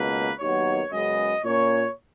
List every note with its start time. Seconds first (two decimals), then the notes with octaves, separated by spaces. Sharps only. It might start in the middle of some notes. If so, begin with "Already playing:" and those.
Already playing: C#2 B2 A#3 B4
0.40 D#2 D#3 F#3 B3 C#5
0.91 F#2 C#3 G#3 B3 D#5
1.43 A#2 A#3 C#4 C#5